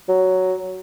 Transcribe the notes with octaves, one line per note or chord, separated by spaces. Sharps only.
F#3